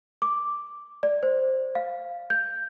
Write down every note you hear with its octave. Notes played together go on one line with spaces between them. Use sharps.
D6
D5
C5
F5
G6